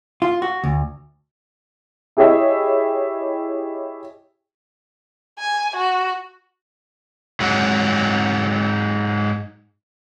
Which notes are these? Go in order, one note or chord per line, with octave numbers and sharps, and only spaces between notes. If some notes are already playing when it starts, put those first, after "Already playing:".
F4
F#4
D2
E4 G4 G#4 C#5 D#5 E5
G#5
F#4
G#2 F#3